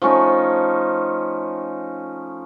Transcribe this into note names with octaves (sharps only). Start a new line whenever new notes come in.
F3 A3 C#4 D#4